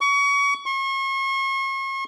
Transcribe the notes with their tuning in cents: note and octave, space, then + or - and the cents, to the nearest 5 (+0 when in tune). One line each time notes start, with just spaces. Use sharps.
C#6 +30
C#6 -40